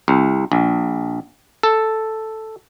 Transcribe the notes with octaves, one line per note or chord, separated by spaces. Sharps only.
C2
A#1
A4